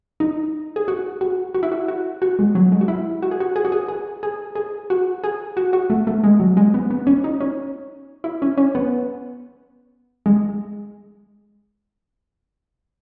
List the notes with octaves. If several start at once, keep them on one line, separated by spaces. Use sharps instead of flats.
D#4
G#4
F#4
F#4
F#4
E4
F#4
F#4
F#4
G#3
F#3
G#3
F#4
E4
F#4
G#4
F#4
G#4
F#4
G#4
G#4
G#4
G#4
F#4
G#4
F#4
F#4
A3
A3
G#3
F#3
G#3
B3
B3
C#4
D#4
C#4
E4
C#4
C#4
B3
G#3